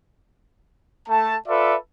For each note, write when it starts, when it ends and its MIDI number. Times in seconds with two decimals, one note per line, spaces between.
1.09 1.35 57
1.09 1.35 81
1.48 1.76 65
1.48 1.76 69
1.48 1.76 71
1.48 1.76 74
1.48 1.76 76